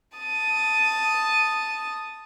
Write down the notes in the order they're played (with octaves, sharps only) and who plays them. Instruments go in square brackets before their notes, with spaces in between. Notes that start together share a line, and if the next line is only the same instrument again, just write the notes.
[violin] A5 D#6